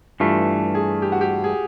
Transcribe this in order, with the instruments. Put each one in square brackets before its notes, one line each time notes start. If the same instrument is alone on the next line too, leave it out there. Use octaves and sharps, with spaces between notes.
[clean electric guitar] G2 E3 A3 [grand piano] F4
[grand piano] G#4
G4
F#4
G4
G#4